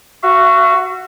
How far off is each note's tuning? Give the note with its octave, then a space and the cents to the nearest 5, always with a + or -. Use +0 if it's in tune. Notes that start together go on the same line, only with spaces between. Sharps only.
F#4 +0 E5 +45